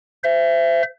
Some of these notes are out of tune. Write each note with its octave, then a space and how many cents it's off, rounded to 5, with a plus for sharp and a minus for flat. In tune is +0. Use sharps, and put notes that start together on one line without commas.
C5 -20 E5 +25